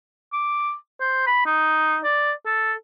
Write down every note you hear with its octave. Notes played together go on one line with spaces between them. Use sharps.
D6
C5
B5
D#4
D5
A4